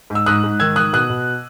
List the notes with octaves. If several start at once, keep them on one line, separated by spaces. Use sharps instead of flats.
G#2
E6
G#2 D#6 F#6
G#2
D#3 E6 G#6
D#3 D#6 F#6
B2 D#6 F#6
B2